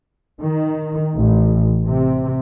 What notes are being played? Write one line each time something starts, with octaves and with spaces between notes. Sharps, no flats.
D#3
A1
C3